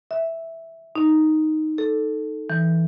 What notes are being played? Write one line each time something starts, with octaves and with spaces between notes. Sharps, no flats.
E5
D#4
A4
E3